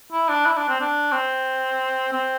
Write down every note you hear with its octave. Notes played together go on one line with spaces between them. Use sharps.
E4
D4
E4
D4
C4
D4
C4
C4